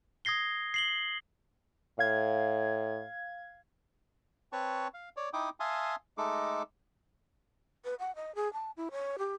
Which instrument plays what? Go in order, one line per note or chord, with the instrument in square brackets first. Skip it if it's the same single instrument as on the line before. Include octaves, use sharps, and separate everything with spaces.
[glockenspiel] D#6 G#6 A#6 C7 G7
C7 F#7 G7
[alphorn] A2 [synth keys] F5 G#6
[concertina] C4 B4 C#5 A5 C#6
F5
C#5 D5
D#4 E4 G5 D6 D#6
E5 F5 G#5 A5 C6 D#6
G#3 A3 D#4 A4 D6
[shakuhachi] B4
F#5
D#5
G#4
A5
E4
C#5
G4